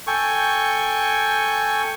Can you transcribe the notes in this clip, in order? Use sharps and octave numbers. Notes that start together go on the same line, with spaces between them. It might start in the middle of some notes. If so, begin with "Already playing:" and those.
A4 G5 G#5 C#6